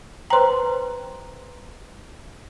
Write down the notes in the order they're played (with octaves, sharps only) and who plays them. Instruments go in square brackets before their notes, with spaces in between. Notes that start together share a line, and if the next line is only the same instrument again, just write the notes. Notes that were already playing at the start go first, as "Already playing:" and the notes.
[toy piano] B4 C5 G5 [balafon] A#5 C6